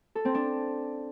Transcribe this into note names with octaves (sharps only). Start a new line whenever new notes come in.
A4
C4
D4